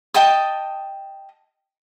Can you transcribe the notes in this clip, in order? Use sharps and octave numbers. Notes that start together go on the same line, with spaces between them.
D#5 G5 A5 D#6